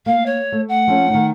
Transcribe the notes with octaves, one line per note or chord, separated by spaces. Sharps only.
A#3 F5
C#5
A3
F#5
F3 A3 C#4
D#3 D#4